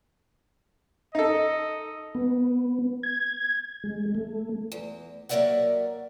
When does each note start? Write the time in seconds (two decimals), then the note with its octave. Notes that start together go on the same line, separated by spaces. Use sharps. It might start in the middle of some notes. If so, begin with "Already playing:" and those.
1.15 D#4 A4 D#5
2.15 B3
3.03 G#6
3.84 G#3
4.15 A3
4.72 E2
5.29 F#3 A#3 A#4 D5 E5 F#5